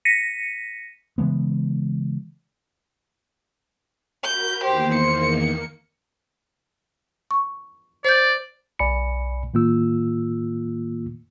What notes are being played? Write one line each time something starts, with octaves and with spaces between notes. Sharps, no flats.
A#6 B6 C#7 D#7
C#3 E3 G#3 B3
F#4 A#4 B5 G6
E2 D#3 A#3 G4 C5
C#7
C#6
C5 D5 G6
B1 D5 G#5 B5 C#7
A2 D#3 A#3 F4 E6